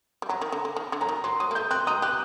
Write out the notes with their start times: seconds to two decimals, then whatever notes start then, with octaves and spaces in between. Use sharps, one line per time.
0.22 G3
0.29 F#3 A#5
0.41 D#3
0.52 D3
0.65 D3
0.76 D#3
0.92 D3
1.00 F#3 A#5
1.09 D#3
1.24 F#3 C6
1.40 F#3 D#6
1.51 A#3
1.55 A3 G6
1.71 C4 F#6
1.87 D#4 D#6
2.02 G4 F#6